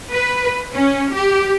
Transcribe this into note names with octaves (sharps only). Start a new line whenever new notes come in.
B4
C#4
G4